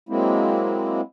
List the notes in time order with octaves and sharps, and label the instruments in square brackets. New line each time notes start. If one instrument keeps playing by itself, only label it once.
[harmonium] F#3 G#3 A#3 C4 E4